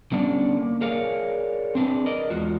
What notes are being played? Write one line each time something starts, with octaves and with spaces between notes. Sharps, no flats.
D3 G3 B3 C#4 D4 D5
A#3
G#4 A#4 C#5 D5 F5
C4 D4 G#4 B4
A#4 D5 D#5
E2 G#3 F4 F#4